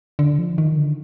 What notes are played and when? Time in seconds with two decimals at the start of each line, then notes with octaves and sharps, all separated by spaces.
0.19 D3
0.39 F3
0.58 D#3
0.77 D3